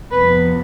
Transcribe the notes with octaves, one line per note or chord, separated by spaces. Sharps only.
F2 C3 F3 B3 B4